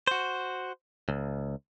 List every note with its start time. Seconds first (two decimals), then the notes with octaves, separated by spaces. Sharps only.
0.07 F#4 C5
1.09 C#2